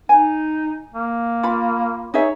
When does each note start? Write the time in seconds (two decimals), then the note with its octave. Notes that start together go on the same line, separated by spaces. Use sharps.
0.09 D#4 G#5
0.94 A#3
1.43 F4 B5
2.14 D#4 G#4 C#5 E5